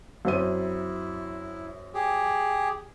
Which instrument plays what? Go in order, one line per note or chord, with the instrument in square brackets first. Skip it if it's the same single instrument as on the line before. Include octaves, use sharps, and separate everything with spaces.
[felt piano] F#2 C4 D#7 [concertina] E4
[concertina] G4 G#4